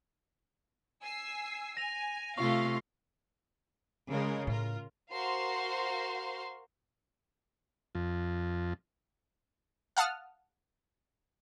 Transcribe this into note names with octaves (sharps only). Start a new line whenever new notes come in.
G#5 E6 C7
G#5 A#6 F7
C3 A3 F4 F5 C6 C#6 C7
C#3 G#3 A#4
A2 F4 A#4
F#4 A#4 C5 F5 C6
F2
F5 F#5 A5 D#6 F6